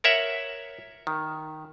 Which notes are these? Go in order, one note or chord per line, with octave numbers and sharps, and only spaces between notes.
A#4 C#5 E5 F#5
D#3